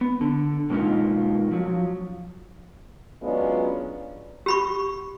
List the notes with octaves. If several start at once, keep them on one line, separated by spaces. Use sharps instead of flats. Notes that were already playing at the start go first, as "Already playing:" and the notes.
B3
D3
B2 G#3 A#3 C#4 D#4 F4
F3 F#3
F#3 G#3 B3 C#4 D4 F4
G4 B5 C#6